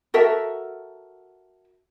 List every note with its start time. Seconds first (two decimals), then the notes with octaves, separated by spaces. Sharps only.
0.14 F#4 A4 A#4 E5